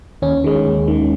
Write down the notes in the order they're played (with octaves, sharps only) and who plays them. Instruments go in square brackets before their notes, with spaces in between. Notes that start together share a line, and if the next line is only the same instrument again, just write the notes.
[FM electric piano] D#2 C#4
D#3 G#3
D#2
D#3 G#3